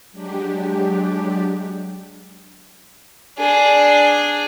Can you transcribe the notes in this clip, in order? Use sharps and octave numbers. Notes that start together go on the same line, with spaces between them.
F#3 G#3 D4 G4
D4 G#4